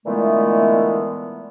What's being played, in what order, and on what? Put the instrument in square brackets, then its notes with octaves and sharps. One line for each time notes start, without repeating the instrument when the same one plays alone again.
[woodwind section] A#2 D3 E3 G#3 A3 B3